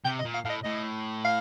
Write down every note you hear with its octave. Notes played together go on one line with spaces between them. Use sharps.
C3 G5
D#5
A#2
F5
A2 D#5 F5
A2 D#5
F5